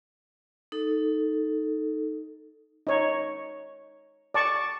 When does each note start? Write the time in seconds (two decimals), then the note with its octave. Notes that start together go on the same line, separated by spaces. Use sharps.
0.72 D#4 A4
2.87 D#4 C#5
4.34 D5 A5 C#6